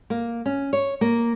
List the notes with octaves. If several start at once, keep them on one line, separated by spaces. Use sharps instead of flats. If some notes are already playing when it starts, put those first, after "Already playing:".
A#3
C#4
C#5
A#3